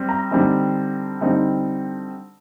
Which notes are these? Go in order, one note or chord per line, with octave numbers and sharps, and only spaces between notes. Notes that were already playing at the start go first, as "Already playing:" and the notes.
Already playing: G3 C4
A#5
D3 G3 C4 D#4
D3 G3 C4 D#4